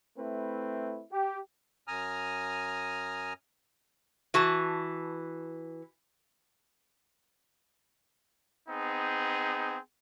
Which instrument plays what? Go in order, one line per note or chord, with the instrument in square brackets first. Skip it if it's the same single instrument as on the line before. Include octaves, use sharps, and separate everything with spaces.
[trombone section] A3 C4 E4 B4
G4
[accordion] F#2 G#5 A#5 D#6 F6
[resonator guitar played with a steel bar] E3 F#4 A5
[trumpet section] B3 C4 D#4 G#4